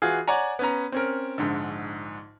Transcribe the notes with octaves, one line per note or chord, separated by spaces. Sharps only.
E3 F4 F#4 G#4
C#5 D5 F#5 G#5 A#5
B3 C#4 A#5
C4 C#4 A#4
A#1 G#2 D3